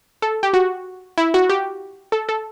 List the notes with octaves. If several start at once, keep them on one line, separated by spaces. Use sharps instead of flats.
A4
G4
F#4
E4
F#4
G4
A4
A4